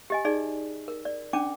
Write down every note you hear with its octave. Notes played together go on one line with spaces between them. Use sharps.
G4 D#5 G#5
D#4 G#4 D5
A#4
D5
C#4 D4 G5 D6